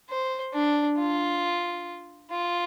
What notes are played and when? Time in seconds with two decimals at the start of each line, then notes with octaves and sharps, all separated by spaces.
0.10 C5
0.53 D4
0.98 F4
2.31 F4